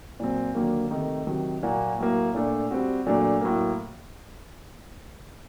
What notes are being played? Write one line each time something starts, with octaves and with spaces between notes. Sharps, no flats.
A#2 F#3 C4
D#2 D3 F#3 A#3
C3 D#3 A3 D#4
C3 D#3 F#3
A#2 F#3 A#3 F#4
A2 F#3 A#3
A#2 A3 D4
G3 C4 F#4
A#2 F#3 A3 D4
A2 F#3 A#3